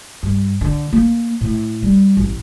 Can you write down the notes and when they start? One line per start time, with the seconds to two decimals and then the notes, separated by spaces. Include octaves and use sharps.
0.23 G2
0.61 D3
0.93 A#3
1.41 A2
1.83 G3
2.17 A1